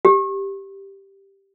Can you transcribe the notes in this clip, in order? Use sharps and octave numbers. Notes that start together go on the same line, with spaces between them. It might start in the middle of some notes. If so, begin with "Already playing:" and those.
G4